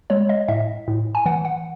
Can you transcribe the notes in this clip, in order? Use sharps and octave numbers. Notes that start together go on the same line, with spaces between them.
G#3 C#5
D#5
A2 E5
A2
G#5
E3 F#5
F#5